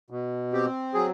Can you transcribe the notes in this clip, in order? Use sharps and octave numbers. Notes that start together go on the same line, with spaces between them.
B2
C4 G4
F#3 G#4